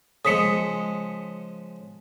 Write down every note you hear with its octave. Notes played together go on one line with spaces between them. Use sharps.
C#3 F3 G#3 D#6 B6 C#7